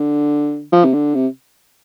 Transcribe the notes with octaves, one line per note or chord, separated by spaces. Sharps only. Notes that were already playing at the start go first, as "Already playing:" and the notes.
Already playing: D3
F3
C3
D3
C3